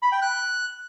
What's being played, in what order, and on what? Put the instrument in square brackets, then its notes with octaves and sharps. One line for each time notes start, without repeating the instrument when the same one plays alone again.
[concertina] B5
G5
F#6